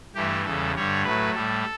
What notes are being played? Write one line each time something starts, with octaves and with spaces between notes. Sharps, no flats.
G2 E3 A3 G4
E2 C#3 G3 A4
G2 D3 G3 C#5
A2 F#3 A3 B4
A2 G3 A4